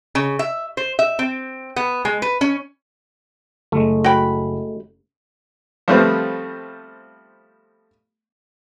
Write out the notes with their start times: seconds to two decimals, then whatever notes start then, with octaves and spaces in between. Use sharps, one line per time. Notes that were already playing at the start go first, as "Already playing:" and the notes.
0.15 C#3
0.39 E5
0.77 C5
0.99 E5
1.19 C4
1.76 B3
2.05 G#3
2.22 B4
2.41 C#4
3.72 F#1 G#3 A3
4.04 F#4 G5 B5
5.88 F3 G3 A3 B3 C4 F4